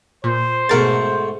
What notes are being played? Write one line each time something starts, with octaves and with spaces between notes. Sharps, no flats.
A#2 C5
G#2 B2 A3 A#4 F#5 A6